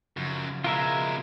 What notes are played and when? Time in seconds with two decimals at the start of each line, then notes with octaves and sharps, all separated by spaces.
0.17 F#2 C#3 F3
0.64 B2 G#3 F4 A#4 E5